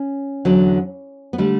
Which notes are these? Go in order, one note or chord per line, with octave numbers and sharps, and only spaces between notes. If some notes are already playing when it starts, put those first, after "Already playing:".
Already playing: C#4
E2 D3 F#3
B3
D3 G3 A3